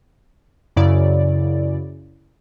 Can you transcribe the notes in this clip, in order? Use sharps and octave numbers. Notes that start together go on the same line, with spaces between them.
F#2 C#3 E4 D5